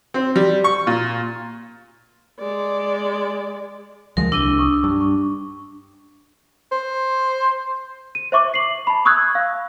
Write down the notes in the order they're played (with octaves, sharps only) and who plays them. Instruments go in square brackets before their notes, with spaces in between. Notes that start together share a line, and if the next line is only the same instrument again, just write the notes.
[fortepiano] C4
G3
C#6
A#2
[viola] G#3 D5
[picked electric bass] D2 F3 G#3 [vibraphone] A#4
[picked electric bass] C2 [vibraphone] D4 [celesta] E6 D#7 G7
[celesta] C#6 D#6 E6
[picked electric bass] G2
[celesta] C#6
[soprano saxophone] C5
[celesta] D#7
C5 E5 C#6 D6
C7 F#7
A5 B5
C#6 D#6 E6 F#6 G#6
F5